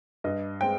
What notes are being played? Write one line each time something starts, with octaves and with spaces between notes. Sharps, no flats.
G2 D#5
G#3 C4 G5